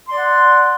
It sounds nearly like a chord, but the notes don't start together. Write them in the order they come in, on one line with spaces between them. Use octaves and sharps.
C6 D5 F#5